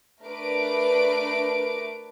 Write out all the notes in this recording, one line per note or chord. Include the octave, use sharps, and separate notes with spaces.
A3 D4 A#4 B4 D6 D7